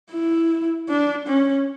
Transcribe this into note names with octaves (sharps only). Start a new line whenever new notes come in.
E4
D4
C#4